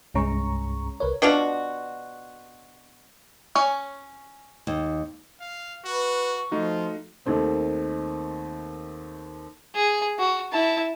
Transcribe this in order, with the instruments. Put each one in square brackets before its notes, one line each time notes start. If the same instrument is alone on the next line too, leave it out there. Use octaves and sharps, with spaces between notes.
[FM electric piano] C2 G2 G#3 C#4 A#5 C#6
C2 A#4 B4 C#5
[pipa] B2 D4 F4 F#4
[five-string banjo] C#4 C#5 G#5
[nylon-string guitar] D#2
[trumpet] F5
[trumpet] F#4 [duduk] B4 [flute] C#6
[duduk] F3 [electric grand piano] A3 D#4 F#4 [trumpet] F4
[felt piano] D#2 D#3 A3 C4
[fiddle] G#4
F#4
E4 A5